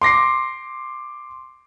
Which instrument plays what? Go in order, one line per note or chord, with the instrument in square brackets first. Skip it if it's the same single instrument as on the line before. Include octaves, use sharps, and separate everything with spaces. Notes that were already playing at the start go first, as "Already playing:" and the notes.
[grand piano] C6 D6 A#6 C7